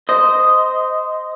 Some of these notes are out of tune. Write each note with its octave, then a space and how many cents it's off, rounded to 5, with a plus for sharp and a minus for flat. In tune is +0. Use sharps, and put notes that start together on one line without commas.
C5 -15 D#5 +0